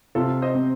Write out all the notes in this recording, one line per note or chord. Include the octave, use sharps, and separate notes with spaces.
C3 F4 A4
C5 D#5
C4